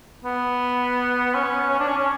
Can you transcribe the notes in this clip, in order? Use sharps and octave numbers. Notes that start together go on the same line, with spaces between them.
B3
C#4
C#4
D4
C#4
C#4